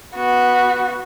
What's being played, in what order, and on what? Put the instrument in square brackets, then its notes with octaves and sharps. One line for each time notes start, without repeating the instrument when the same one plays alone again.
[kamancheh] B3 F#4